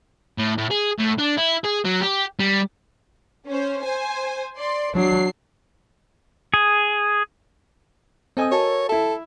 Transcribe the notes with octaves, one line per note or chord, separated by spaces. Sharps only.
A2
A2
G#4
A2
D4
E4
G#4
F#3
G4
G3
C#4 C5
C5 G#5
D5 C6
F#3 D4 C7
G#4
C4 A4 D#5 G#5 D#6
F#4 A#4 C#5 A5
E4 A4 E5